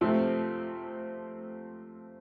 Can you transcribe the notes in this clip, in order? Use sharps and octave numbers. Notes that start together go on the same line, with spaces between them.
C3 F3 A3 C4